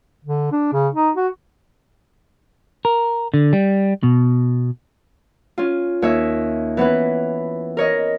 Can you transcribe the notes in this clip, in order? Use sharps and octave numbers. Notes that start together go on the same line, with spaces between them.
D3
D4
C#3
D#4
F#4
A#4
D3
G3
B2
C#4 F4
D#2 C#5 E5
E3 B3 C#4 B4
A#4 C#5 D#5